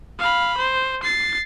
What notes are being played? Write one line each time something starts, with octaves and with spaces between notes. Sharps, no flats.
F5 B5
C5
A6 C7